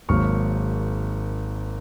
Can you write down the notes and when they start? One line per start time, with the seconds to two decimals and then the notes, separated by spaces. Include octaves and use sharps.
0.09 G#1 G#2 F#3 A#3 C#6 F6